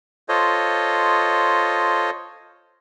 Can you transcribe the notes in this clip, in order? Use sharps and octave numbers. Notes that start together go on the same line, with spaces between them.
F4 A4 C5 C#5 D#5